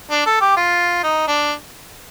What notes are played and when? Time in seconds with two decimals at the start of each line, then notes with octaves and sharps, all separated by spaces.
0.11 D4
0.26 A4
0.41 G4
0.57 F4
1.03 D#4
1.28 D4